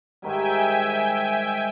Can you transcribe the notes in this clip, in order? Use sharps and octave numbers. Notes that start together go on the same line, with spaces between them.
G#2 D#3 G3 E5 G5 G#5